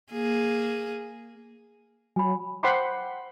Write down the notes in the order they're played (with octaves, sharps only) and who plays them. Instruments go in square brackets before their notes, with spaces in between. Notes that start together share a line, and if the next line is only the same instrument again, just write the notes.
[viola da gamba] A#3 G#4
[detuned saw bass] F#3 [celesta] G#5 B5
[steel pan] C5 F#5 G5 B5 C6 D6